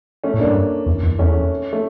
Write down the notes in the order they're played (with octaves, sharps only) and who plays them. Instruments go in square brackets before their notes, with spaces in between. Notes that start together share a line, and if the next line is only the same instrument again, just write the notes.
[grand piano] A3 C#4
[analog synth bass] A2
[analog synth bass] G2 [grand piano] A#3 D4
[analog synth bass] E2
E2
[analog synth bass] E2 [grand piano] A3 C#4
[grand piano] A3